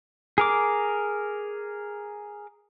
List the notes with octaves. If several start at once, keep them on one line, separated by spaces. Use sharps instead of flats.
G#4 A#4 D6